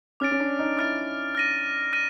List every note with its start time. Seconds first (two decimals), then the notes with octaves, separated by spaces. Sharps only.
0.20 C#4 D6 F6 A6 D7
0.31 C#4
0.40 D4
0.59 D#4
0.77 E4 D6 F6 A6 D7
1.35 F6 A#6 D#7
1.93 F6 A#6 D#7